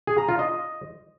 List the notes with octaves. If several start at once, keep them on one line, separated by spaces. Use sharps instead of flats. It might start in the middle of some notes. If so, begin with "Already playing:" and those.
G#4
A#5
F4
D#5